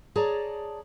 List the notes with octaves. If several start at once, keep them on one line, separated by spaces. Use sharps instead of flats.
G#4 C#5 D5 A5 A#5